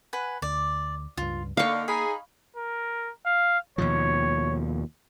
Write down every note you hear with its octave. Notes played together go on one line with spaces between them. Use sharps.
B4 F#5 G#5
D2 D5
C#2 G2 F4
D3 A#3 D#4 C#5 F5 C#6
D#4 G#4 B5
A#4
F5
D#2 B2 F3 C#5